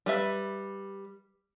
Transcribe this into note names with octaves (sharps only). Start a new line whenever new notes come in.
G3 B4 E5